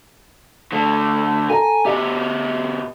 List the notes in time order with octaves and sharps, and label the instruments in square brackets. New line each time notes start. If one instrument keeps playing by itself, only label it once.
[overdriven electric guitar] D3 A3
[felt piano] A4 A#5 [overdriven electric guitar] G#5
[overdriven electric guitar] B2 G4 [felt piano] E5